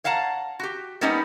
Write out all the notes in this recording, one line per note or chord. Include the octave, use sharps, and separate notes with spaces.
C#5 F5 F#5 A5 A#5
F#4 G4
G3 A#3 B3 C#4 D#4 G4